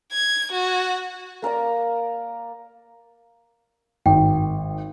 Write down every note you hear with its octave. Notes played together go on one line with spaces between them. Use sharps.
G#6
F#4
A#3 A#4 D5 A#5
G#1 G5